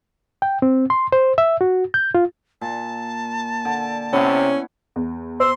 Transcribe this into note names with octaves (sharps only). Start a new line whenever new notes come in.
G5
C4
C6
C5
E5
F#4
G6
F4
A#2 A5
D3
C3 B3 C#4 E4 C#5
E2
C5 C6 E6